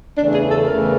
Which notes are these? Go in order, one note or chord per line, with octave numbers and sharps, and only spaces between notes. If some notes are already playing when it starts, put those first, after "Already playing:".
E2 C#3 E3 A3 D4
G#4
A4
E2 C#3 E3 A3 A#4